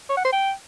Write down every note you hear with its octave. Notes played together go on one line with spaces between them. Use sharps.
C#5
F#5
C5
G5